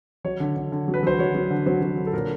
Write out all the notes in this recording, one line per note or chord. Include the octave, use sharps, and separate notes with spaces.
F#3 C#5
D3
D3
D3
F#3
B4
F#3 C5
F#3 C#5
F#3
D3
F#3 C5
F#3
D3
A4
A#2 A#4